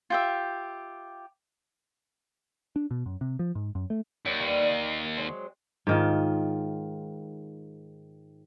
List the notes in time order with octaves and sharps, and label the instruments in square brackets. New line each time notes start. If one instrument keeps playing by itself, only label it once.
[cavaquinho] F4 G4 E5
[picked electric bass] D4
B2
F#2
C3
F3
G#2
F#2
A3
[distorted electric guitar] D#2 [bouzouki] F#3
[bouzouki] G3 B3
A#3 D#4
F#3 G#3 C4
[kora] G#2 D#3 F4